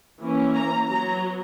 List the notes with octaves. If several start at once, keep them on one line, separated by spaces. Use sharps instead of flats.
E3 A#3 C#4
A#5
F#3 B3 A#5